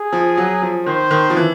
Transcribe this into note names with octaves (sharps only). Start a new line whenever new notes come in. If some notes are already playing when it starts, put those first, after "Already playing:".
Already playing: G#4
F3
F#3
F3
D#3 C5
D#3
F3
E3